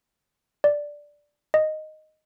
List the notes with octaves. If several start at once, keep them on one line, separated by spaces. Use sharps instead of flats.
D5
D#5